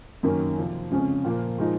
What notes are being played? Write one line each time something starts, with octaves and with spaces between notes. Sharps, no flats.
F#2 D#3 A#3 C#4
F2 C3 F3
F2 C#3 G#3 C#4
A#2 F3 A#3
A#2 F3 G#3 D#4